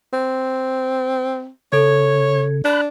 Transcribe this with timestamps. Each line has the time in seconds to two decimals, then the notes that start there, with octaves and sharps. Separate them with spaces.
0.13 C4
1.72 C#3 A4 C#5 G#6
2.65 D4 B5 F#6